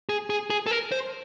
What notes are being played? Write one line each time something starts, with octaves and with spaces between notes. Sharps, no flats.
G#4
G#4
G#4
A4
A#4
C5